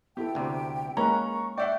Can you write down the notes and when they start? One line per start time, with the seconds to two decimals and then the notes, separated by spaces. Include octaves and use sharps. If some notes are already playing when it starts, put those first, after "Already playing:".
0.17 B3 E4 G4 A4 G5
0.35 D2 C3
0.97 G#3 A#3 C#4 B4 A#5 C#6
1.58 D5 E5 F#5 G5